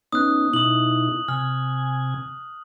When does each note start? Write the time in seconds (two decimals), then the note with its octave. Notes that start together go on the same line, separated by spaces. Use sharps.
0.12 B3 C#4 D#4 D#6 F#6
0.53 B2 D#4 E4 D#6 F#7
1.28 C3 G#5 F6